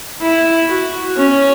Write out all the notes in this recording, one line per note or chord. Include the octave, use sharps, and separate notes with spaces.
E4
F#4
C#4